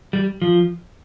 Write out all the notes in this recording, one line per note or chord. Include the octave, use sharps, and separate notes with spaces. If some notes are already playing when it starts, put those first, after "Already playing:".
G3
F3